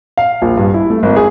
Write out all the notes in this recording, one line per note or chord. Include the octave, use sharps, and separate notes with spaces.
F5
A#1
G2
E4
A3
G#1
G#4